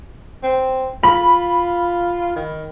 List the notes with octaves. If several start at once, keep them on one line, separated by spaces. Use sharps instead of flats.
C4
F4 B5
D#3